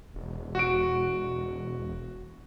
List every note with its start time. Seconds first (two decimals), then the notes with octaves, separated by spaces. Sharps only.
0.14 E1
0.55 F#4 D7